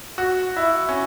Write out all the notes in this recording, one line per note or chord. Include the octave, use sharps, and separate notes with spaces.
F#4
E4
C#4